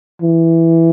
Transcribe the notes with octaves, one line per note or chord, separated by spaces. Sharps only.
E3